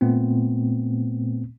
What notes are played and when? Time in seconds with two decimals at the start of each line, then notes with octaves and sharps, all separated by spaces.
0.01 A#2 A3 B3 C4